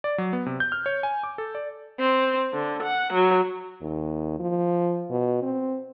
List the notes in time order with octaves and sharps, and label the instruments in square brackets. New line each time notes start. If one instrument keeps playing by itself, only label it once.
[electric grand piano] D5
F#3
B3
C3
G6
F6
C#5
G#5
D6
A4
D5
[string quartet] C4
D3
F#5
F#3
[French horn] D#2
F3
B2
C4